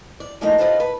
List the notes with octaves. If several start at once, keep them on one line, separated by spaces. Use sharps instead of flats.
D5
E3 F3 A3 A#3 D#4
D#4 F4 G4 A4 B4 C5
B4